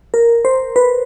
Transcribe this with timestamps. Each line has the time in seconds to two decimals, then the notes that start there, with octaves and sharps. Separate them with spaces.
0.14 A#4
0.45 C5
0.76 B4